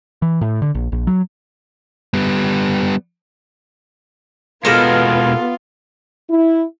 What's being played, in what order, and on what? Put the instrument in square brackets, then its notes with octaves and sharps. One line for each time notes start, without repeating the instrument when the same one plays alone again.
[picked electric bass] E3
A2
D3
A#1
A#1
F#3
[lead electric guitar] G3 B3
[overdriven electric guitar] B2 G#3 [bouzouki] G3 A4 A#4 [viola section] B3 [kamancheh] F4
[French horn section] E4